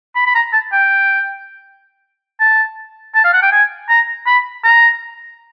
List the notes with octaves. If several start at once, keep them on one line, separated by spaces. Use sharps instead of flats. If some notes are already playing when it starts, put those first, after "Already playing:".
B5
B5
A#5
A5
G5
A5
A5
F5
F#5
G5
G#5
A#5
B5
A#5